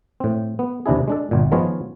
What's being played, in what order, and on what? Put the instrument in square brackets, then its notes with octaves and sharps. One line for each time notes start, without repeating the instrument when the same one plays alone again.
[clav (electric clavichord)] A2 C4
B3
D#2 C3 D4 E4 G#4
G#3 D4 A4
G1 A#2
D#3 F3 G#3 B3 F4 C#5